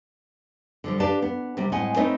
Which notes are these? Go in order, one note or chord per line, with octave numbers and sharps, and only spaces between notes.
D3 F3 G3
D4 G4 B4 D5 F5 A5
B3
C3 G3
A2 G#3 C4 D#5 F#5 G#5
A3 C4 D#4 B4 C#5 D#5